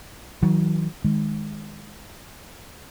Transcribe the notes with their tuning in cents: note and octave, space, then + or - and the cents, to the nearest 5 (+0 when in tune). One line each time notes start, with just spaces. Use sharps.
D#3 +45 F#3 +0
D#3 +0 G#3 +0